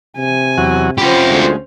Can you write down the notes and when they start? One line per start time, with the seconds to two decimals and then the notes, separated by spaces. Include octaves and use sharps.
0.17 C3 G#5
0.58 E2 F#3 F#4
0.98 C#4 F4 G4 C5 B5
1.30 D2 G#3